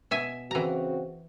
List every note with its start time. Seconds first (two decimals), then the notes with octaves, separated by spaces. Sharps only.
0.11 B2 E5 G#5
0.51 C#3 E3 C4 F#4 A#5